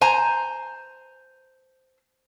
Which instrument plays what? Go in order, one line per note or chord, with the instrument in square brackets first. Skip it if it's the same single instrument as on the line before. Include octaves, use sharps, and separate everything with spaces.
[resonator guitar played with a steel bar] C5 G#5 A#5